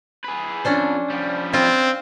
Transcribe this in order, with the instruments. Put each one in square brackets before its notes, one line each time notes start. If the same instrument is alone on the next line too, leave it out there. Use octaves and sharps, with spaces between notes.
[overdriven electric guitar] G#4 B4
[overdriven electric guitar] F2 [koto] C#4 D4 C5
[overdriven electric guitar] F3 G3
[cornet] C4 [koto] F4